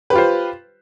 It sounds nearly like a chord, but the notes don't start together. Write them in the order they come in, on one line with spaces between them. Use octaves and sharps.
B4 G4 F4 C5